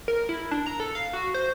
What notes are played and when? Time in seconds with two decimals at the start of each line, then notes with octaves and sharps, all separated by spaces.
0.08 A#4
0.29 E4
0.51 D4
0.66 A#5
0.80 A4
0.95 F5
1.13 F#4
1.34 C5